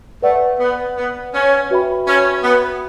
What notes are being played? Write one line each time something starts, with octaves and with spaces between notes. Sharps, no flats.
A3 B4 D5 F#5
B3
B3
C#4
F#4 B4 E5 G5 B5
C#4
B3